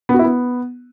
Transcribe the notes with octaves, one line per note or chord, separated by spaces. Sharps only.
B3
F#4
E4
B3